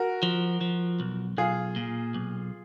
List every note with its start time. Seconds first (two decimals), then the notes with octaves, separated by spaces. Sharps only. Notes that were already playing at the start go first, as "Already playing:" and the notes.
Already playing: F#4 A#4
0.23 F3
0.61 F3
1.00 B1
1.37 B1 F4 G#4
1.76 A#2
2.14 B1